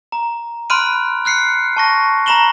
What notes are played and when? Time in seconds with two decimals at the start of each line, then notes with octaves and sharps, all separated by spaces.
0.12 A#5
0.70 B5 C6 F6 F#6 D7 D#7
1.25 F6 F#6 C7 C#7
1.77 A5 C#6 A#6
2.26 A#5 B5 A#6 E7 F#7 G7